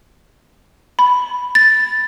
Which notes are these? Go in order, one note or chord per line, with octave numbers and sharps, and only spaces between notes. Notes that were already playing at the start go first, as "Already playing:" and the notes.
B5
A6